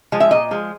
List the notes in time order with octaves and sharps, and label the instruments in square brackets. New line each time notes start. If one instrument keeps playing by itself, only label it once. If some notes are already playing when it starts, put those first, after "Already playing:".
[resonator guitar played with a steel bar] F3 G#3
E5
A#2 D#5
F3 G#3